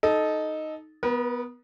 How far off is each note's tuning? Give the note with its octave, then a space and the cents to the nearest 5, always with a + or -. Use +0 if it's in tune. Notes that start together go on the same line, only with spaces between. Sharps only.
D#4 +0 A4 -15
B3 +0 A#4 +45